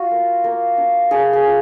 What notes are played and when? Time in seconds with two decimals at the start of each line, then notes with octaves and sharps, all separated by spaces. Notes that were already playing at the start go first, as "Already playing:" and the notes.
Already playing: F4 F#4
0.11 A#3
0.44 A#3
0.78 D4
1.11 D4 G#4
1.33 G#4
1.45 F4